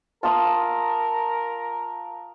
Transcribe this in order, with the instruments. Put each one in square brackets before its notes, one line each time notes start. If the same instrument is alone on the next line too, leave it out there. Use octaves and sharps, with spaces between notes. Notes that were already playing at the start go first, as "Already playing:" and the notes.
[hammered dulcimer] F4 [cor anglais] A#4 [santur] A5 D#6 E6